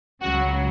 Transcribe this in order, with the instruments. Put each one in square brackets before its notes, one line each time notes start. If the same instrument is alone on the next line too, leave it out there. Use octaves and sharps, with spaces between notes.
[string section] C#2 C#3 F#3 F#4